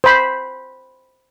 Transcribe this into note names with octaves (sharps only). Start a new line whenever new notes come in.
C5 B5